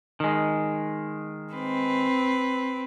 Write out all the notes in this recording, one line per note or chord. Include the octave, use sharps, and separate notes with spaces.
D#3 G#3
C4 B4